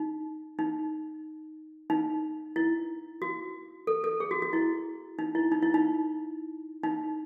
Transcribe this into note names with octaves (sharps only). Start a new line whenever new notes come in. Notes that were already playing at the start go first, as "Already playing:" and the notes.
Already playing: D#4
D#4
D#4
E4
F#4
A4
A4
G#4
F#4
F#4
E4
D#4
E4
D#4
E4
D#4
D#4